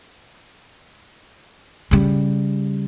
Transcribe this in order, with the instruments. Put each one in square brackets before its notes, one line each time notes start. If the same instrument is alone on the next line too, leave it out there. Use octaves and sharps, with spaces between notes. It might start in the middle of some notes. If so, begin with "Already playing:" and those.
[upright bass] C#3 G3